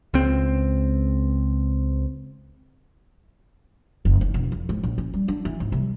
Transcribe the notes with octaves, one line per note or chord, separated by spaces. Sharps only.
C#2 C4
F#1
D#3
E1
F2
G#2
A#1
C#4
G3
D4
E3
G#1
C2